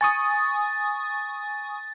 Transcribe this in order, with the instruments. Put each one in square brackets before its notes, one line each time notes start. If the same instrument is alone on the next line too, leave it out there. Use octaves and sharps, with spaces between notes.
[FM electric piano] G#5 C#6 D#6 [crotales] A6